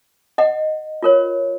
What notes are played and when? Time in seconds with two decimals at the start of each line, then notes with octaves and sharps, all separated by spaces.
0.38 D#5 F#5
1.03 F4 A#4 C#5